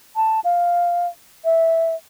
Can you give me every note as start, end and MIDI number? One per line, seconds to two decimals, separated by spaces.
0.16 0.40 81
0.44 1.07 77
1.45 1.95 76